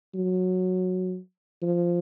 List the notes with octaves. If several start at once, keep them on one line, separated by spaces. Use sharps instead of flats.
F#3
F3